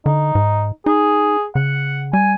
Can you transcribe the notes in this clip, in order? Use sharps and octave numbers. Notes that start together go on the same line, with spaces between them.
D3 D#4
G#2
D#4 G#4
C#3 F#5
G3 G#5